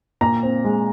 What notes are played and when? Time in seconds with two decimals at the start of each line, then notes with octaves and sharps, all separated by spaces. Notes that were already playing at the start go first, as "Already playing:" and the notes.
0.21 A#2 A#5
0.43 C4
0.64 G#3